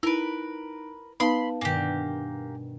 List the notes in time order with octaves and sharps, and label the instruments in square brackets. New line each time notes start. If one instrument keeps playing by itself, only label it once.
[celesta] D#4 D7 [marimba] E4 [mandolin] A#4 B4
[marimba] B3 D#4 [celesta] B4 F5 A5 [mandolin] B5 C6
[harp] G2 B2 D#3 [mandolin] A#3 G4 [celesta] G#5